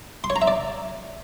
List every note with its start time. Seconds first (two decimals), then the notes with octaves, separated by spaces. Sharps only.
0.24 C6
0.30 C#5
0.36 A#5
0.42 E5
0.47 D5